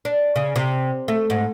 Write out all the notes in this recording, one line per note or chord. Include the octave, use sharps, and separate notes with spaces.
D4
C#3
C3
A3
G#2